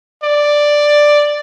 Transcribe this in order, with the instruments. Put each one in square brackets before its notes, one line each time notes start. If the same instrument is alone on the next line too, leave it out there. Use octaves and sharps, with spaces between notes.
[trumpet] D5